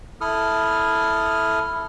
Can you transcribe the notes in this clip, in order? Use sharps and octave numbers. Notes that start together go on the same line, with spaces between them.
E4 A4 D#6 F6